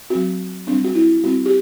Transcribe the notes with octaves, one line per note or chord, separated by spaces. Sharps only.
F#3 C4 F#4
G3 C4 D4
F#4
E4
G3 C4 F#4
G4